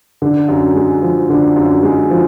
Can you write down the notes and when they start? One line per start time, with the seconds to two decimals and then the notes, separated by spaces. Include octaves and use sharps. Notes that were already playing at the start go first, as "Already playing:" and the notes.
0.22 D3
0.49 F#2
0.75 G#3
1.02 F3
1.30 D3
1.56 F#2
1.83 G#3
2.10 F3